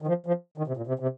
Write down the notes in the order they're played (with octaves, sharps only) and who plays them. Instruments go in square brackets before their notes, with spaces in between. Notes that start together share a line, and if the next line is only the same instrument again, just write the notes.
[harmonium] D#3
F3
F3
D#3
C3
A#2
C3
C3